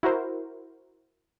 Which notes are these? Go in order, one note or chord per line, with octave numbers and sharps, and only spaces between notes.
E4 F#4 A#4 C5